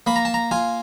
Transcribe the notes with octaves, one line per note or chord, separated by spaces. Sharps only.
A#3 B5
A#5
A5
A#5
F4 G#5